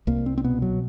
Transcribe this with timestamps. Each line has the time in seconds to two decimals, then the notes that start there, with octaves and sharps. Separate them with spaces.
0.07 C2 A#3
0.26 C4
0.38 C4
0.44 B2 B3
0.62 F#3